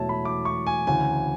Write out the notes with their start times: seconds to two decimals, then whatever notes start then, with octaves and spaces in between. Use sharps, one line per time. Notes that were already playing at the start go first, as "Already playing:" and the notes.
Already playing: E1 E2 B2 F#3 A3 C#5 E5 A5
0.09 B5
0.25 D6
0.45 C#6
0.67 G#5
0.87 D2 C#3 E3 G#5